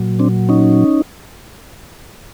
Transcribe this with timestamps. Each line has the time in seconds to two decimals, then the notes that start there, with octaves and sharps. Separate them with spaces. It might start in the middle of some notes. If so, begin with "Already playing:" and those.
Already playing: A#2 F#3
0.19 C4 D4
0.49 C#4 D#4